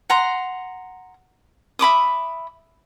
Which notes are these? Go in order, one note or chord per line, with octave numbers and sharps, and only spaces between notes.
F#5 A#5 C6
E5 B5 D6 D#6